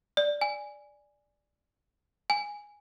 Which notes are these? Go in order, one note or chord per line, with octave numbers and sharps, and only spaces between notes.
D5
G#5
G#5